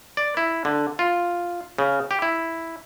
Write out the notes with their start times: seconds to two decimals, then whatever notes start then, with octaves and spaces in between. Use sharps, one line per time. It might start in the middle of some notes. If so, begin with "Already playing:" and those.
0.17 D5
0.37 E4
0.65 D3
0.99 F4
1.78 C#3
2.11 G4
2.22 E4